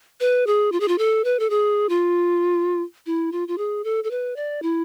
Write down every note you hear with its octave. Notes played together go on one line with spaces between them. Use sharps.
B4
G#4
F4
G#4
F4
A4
B4
A4
G#4
F4
E4
F4
F4
G#4
A4
A4
B4
D5
E4